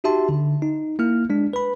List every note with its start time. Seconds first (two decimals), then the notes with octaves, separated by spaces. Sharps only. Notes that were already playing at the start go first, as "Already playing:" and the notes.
0.04 D#4 F#4 G4 E5 A5 C6
0.29 D3
0.62 D#4
0.99 A#3 E4 F6
1.30 G#3 D4
1.53 B4 B5